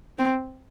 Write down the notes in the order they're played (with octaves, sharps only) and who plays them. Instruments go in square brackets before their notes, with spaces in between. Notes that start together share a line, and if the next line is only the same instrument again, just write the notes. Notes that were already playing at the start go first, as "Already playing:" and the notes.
[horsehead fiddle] C4